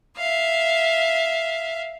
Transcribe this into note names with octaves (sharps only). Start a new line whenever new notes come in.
E5 F5